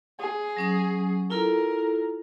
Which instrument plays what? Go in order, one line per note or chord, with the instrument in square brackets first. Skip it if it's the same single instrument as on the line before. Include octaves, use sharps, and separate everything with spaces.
[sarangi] G#4
[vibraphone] F#3 C#4 D#6
[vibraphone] E4 F4 A4 [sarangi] A#4